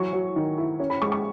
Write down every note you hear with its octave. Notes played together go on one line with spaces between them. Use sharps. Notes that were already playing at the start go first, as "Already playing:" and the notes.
Already playing: E3 F#3 C#6
F#3
D#3
E4
C#4
B5
G#3 C#6
C#6